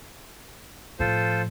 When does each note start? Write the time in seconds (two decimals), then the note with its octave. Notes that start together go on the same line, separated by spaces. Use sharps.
0.99 A2 F3 F4 A4 C5